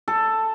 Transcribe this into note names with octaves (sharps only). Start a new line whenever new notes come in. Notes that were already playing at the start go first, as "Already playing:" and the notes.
A4